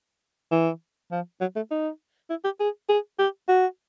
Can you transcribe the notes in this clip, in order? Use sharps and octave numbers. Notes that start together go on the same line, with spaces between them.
E3
F3
F#3
A3
D#4
E4
G4
G#4
G#4
G4
F#4